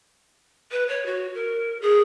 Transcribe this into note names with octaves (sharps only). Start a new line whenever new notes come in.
B4
C#5
F#4
A#4
G#4